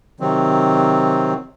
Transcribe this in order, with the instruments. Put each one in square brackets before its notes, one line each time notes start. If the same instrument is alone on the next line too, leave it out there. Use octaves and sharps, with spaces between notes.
[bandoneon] C3 D#3 F#3 C4